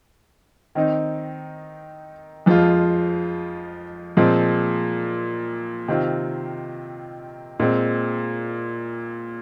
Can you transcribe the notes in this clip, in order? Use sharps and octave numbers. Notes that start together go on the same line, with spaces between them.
D#3 C4 D#4
F2 F3 G#3 F4
A#2 F3 G#3 C4
C3 D#3 C4 F4
A#2 G#3 C4